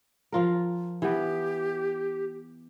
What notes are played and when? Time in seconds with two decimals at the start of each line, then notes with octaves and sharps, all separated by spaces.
0.32 F3 F4 A#4
1.02 E3 B3 G4